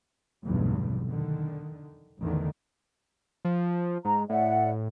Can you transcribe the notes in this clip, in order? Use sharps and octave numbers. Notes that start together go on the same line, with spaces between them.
F1 B1 E2 G2 B2 D3
D3 D#3
A1 E2 D3 D#3
F3
G#2 A#5
A2 D5 E5 F#5